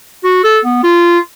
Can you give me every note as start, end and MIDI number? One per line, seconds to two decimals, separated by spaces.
0.24 0.42 66
0.44 0.60 69
0.65 0.81 59
0.83 1.19 65